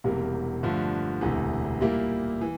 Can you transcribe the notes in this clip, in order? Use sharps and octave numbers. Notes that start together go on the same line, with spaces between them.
E1 E2 C3 G3 A#3
G2 D3 F3 A3
E1 D2 C3 E3
A#2 G3 A#3 E4
E3